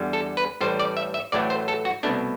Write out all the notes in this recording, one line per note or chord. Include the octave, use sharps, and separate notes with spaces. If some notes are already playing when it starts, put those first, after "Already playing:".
Already playing: E2 D3 G3
A4
B4
A1 A2 G3 C5
D5
E5
E5
A1 A2 F#3 A3 D5
C5
A4
F#4
C2 B2 A3 D4